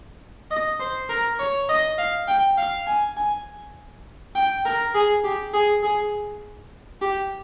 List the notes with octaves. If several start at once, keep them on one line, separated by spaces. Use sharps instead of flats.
D#5
C5
A#4
C#5
D#5
F5
G5
F5
G#5
G#5
G5
A#4
G#4
G4
G#4
G#4
G4